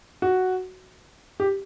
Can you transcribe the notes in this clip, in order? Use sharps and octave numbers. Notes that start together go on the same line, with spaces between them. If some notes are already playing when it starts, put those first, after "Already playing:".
F#4
G4